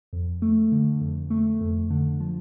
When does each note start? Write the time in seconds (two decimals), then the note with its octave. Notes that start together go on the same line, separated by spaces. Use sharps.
0.13 F2
0.42 A3
0.72 D3
1.01 F2
1.30 A3
1.61 F2
1.90 D3
2.20 F3